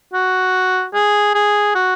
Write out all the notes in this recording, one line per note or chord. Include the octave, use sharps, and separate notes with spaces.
F#4
G#4
G#4
F#4